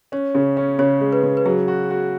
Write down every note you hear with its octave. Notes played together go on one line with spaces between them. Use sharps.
C#4 C#5
C#3
C#4
C#3 C#5
G#3
B4
C#3
B4
F#3 G#4
F#4
F#4